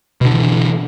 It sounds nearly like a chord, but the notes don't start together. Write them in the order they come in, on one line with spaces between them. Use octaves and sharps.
B2 D3 E3